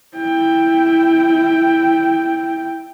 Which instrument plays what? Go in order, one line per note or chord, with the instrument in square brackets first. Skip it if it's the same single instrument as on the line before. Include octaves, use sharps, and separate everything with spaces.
[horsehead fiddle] E4 G5